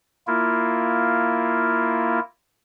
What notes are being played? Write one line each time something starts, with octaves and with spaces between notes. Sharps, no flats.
A#3 E4 F4